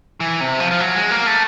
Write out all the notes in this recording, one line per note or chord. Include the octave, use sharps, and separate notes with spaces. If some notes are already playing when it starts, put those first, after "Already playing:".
E3
C3
F3
F3
F#3
G#3
A#3
A3